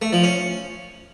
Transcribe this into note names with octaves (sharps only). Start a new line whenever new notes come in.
A3
F3
C#4